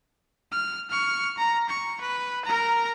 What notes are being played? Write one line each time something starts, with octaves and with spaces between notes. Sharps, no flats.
F6
C#6 F6
A#5
C#6
B4
A#4 A#5